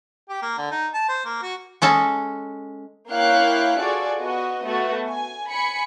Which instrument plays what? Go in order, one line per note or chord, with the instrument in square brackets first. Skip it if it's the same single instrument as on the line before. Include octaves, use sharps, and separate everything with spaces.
[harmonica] G4
A#3
D3
D#4
A5
C5
A#3
F#4
[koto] G#3 C#4 A4
[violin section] A#3 E4 C#5 F5 G5 F#6
F4 F#4 G#4 A4 D5
B3 F#4 D#5
A3 B3 F#4
G#5
G#5 B5 C#7